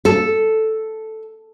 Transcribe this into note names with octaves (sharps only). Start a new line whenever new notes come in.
A4